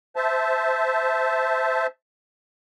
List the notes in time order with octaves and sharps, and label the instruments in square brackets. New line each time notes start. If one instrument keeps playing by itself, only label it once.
[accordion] C5 E5 A5